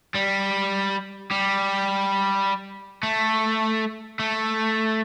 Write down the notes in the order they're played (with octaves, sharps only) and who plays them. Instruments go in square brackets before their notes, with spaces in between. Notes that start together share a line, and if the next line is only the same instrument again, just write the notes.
[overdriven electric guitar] G3
G3
A3
A3